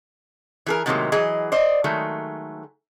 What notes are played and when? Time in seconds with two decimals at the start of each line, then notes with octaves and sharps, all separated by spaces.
0.66 E3 G#4 A#4
0.86 A2 C3 D#3 F#3 G#3 A#3
1.12 E3 F#3 G#4 D#5
1.52 C5 D5 D#5
1.84 D#3 F#3 G#3 A3